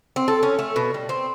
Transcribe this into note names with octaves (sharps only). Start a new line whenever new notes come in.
C4
A4
C#4
A3
B2
G3
C4